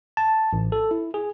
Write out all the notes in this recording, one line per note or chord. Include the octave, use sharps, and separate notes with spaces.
A5
A1
A4
E4
G#4